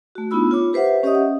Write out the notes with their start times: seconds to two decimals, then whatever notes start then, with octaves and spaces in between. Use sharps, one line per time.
0.15 A3 F#4
0.31 B3 D4 D#4 F4 B5 E6
0.51 F4 C#5 D6
0.73 G4 B4 C5 E5 F#5
1.03 C#4 G4 C#5 D#5 E5 D#6
1.15 F#5